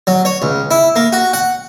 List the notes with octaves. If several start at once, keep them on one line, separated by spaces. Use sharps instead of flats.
F#3
C#5
C#2
E4
A#3
F#4
F#5